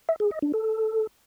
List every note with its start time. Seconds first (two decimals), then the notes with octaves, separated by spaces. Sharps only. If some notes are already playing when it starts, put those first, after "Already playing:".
0.09 E5
0.20 G#4
0.31 D#5
0.42 D4
0.54 A4